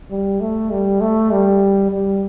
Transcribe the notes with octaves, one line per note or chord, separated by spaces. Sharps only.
G3
A3
G3
A3
G3
G3